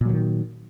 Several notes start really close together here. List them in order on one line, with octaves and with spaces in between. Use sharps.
A#2 F#3 E3 D#3